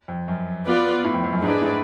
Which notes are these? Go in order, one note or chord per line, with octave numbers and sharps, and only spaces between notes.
F2
F#2
B3 F4 B4 D5
A2
F2
F2
F#2
G#2 G#3 D4 G#4 B4 D5
A2